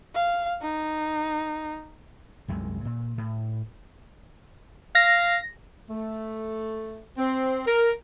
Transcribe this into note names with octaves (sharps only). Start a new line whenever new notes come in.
F5
D#4
C2 F#2 C3 G#3
A#2
A2
F5 A#6
A3
C4
A#4